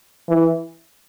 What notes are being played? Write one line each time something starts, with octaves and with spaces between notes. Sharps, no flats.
E3